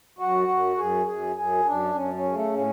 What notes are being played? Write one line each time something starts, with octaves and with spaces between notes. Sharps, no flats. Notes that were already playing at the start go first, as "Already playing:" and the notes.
F#2 F#4
F#2
F#2 G#4
F#2 G#4
F#2 G#4
F#2 D4
F#2 C#4
C#4
C#3
A3
A2 C#4